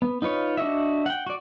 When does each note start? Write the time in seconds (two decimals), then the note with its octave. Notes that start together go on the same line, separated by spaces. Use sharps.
0.02 B3
0.22 D#4 F4 B4 C#5
0.57 D4 F#4 D#5 E5
1.06 F#5 G5
1.26 F#4 D5